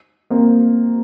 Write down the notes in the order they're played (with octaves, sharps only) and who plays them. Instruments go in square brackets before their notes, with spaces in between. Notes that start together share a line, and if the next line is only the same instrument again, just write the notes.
[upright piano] A#3 C4